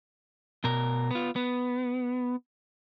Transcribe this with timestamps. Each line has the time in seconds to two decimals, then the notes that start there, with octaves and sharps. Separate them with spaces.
0.64 B2 A#4
1.11 B3 F4
1.36 B3